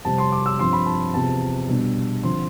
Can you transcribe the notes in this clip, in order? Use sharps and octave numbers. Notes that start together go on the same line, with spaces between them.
F2 C3 G3 A5
C6
D6
E6
G2 F3 C4 C6
B5
A5
E2 C3 F3 A5
B2 G3 D4
D3 F3 C4 C6